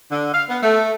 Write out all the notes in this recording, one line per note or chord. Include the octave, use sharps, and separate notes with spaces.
D3
F5
B3
A3